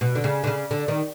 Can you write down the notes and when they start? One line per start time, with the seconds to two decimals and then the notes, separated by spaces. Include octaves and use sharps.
0.01 B2
0.15 D3
0.24 C#3
0.44 D3
0.47 C#3
0.71 D3
0.88 D#3